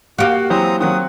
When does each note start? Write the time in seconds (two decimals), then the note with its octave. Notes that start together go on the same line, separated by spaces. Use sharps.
0.18 A#3 F#4 G4 F5 F#5
0.50 E3 F#3 C4 C5 A#5 D#6
0.81 D#3 F#3 C4 F#5 D#6